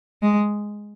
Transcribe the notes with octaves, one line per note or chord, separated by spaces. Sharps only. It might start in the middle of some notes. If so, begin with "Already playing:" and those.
G#3